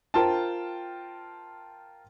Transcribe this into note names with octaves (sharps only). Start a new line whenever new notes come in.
F4 A#4 C5 G5 A5